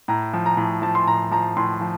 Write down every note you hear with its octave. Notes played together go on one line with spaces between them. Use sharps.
A2 A#5
F3
A#5
A2
F3 A5
C6
A2 A#5
F3 A#5
A2 C6
F3